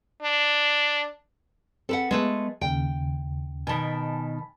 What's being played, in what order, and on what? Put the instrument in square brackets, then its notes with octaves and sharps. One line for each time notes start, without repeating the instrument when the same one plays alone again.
[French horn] D4
[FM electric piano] C4 [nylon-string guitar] A4 B4 F#5
[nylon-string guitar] G#3 A3 B4 [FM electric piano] B3
[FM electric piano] D#2 C#3 [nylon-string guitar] G5
[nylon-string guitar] B2 D#3 [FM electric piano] G#5 A5 B5